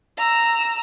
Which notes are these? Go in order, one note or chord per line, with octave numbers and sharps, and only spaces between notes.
A#5 E6